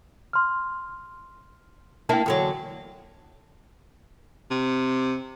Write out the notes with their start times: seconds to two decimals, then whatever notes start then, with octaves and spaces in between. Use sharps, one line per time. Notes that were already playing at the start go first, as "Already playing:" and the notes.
0.33 C6 F6
2.09 A#3 D4 E4 G5 A5
2.26 E2 D3 F#3
4.51 C3